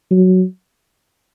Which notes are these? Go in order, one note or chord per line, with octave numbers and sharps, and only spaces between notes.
F#3